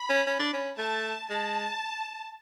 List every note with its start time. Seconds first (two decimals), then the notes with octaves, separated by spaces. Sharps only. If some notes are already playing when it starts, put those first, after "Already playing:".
Already playing: B5
0.09 C#4
0.27 C#4
0.39 D4
0.53 C#4
0.78 A3 A5
1.30 G#3 A5